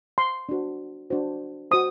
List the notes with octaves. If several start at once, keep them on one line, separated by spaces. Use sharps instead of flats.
C6
D4 F#4 C5
D4 F#4 C5
F#4 C5 D#6